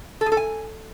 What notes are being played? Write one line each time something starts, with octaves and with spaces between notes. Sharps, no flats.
A4
G#4
A4
G#5